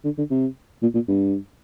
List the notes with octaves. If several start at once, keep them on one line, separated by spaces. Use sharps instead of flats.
D3
D3
C3
A#2
A#2
G2